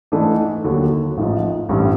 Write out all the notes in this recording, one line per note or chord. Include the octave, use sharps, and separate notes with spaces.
G#2 E3 A3 D4
D#2 D3 F#3
A1 G#2 F3
A1 G2 E3 G3 C4